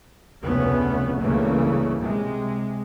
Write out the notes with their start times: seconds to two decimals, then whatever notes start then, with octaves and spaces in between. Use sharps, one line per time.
0.43 F1 D2 C#3 A3 B3 C#4
1.20 C#2 G2 C#3 E3 A3 A#3
2.00 C3 G#3